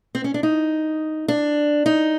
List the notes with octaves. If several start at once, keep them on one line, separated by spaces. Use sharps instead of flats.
C4
C#4
D4
D#4
D4
D#4